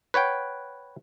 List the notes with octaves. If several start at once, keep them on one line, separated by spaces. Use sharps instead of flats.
B4 C#5 F#5 G5